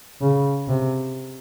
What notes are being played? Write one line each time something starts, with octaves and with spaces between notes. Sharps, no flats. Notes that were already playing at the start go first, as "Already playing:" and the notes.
C#3
C3